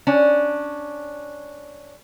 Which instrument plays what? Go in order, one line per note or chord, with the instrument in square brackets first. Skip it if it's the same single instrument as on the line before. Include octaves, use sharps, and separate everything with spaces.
[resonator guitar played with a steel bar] C#4 D4